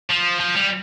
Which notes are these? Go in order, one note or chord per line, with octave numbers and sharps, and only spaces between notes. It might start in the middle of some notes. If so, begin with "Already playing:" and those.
F3
F3
G3